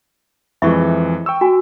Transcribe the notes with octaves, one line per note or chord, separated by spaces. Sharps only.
F2 E3 G#3 E5 B5 C#6
G5 C#6 E6
F#4 G#5